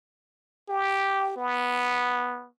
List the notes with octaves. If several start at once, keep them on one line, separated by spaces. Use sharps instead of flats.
G4
B3